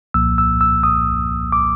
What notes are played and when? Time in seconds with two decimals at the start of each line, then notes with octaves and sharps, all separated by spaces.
0.14 C2 A#2 F3 A#3 E6
0.38 E6
0.61 E6
0.83 D#6
1.52 D6